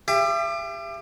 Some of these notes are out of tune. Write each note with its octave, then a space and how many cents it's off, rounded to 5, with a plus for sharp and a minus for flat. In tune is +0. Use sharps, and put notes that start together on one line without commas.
G4 +25 E5 +40